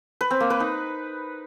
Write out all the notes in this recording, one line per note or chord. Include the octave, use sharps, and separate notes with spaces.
B4
C4
A#3
B4
D#4